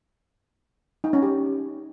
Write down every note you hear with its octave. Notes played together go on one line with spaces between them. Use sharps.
D#4
C#4
G4